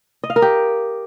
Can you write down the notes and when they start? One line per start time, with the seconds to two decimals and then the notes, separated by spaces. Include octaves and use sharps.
0.24 D#5
0.30 F5
0.36 A#4
0.42 G4